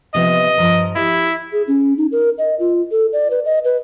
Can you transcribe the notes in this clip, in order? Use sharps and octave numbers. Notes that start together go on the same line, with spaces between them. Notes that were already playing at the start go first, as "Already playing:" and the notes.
C3 F3 B3 D#5
G2 F3 A#4
E4 G4 F5
G#4
C#4
D#4
A#4
D#5
F4
A4
D5
B4
D#5
B4